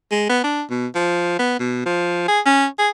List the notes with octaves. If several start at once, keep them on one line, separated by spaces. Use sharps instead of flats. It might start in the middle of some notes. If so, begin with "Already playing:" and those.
G#3
B3
D4
B2
F3
B3
B2
F3
G#4
C#4
G#4